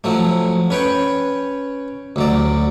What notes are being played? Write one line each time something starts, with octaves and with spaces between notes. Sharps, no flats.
F3 F#3 A3
C#4 B4 C#5 G5
D2 F#3 D5